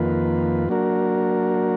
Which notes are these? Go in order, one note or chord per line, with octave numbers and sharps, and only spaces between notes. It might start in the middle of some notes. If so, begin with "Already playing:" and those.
Already playing: F2 D#3 A#3 F4 B4
F#3 A#3 D4 F#4 A#4